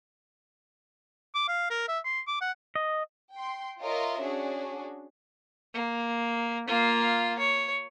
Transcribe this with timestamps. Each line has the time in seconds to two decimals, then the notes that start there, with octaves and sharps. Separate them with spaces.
1.35 D6
1.48 F5
1.70 A#4
1.88 E5
2.05 C6
2.27 D6
2.41 F#5
2.75 D#5
3.35 G5 C6
3.81 F4 A#4 C#5 D#5 E5
4.22 C#4 D4 F#4 G#4
5.74 A#3
6.67 A#3 F4
7.39 C#5